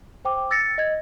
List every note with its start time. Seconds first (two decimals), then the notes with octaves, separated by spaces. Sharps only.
0.25 C5 G5 D6
0.51 E6 A6 A#6 C#7
0.78 D#5 G#6